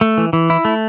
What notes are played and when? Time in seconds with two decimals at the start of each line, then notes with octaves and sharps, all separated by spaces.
0.01 A3
0.18 E3
0.33 E3
0.50 E4
0.65 A3